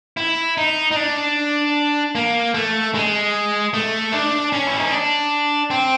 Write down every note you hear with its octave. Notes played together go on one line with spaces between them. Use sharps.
E4
D#4
D#4
D4
A#3
A3
G#3
A3
D4
C#4
E4
D#4
D4
C4